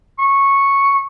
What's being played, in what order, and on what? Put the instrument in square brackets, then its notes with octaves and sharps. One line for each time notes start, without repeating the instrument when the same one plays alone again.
[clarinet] C#6